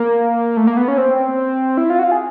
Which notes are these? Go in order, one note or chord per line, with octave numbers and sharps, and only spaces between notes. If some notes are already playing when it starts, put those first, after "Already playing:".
Already playing: A#3
A3
A#3
B3
C#4
C4
E4
F4
F#4
F4
G#4